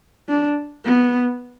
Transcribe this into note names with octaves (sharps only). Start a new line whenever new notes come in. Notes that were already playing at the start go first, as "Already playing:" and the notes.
D4
B3